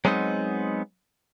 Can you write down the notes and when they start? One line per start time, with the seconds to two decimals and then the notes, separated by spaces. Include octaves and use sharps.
0.05 F#3 G#3 B3 C4 D#4